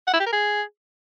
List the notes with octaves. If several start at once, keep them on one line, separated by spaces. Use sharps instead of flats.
F#5
E4
G4
A#4
G#4